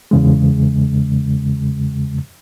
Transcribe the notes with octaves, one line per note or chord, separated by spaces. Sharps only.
E2 C#3 G#3